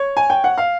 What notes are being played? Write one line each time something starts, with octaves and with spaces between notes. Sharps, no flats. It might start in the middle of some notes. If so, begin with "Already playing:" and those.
Already playing: C#5
G#5
G5
F#5
F5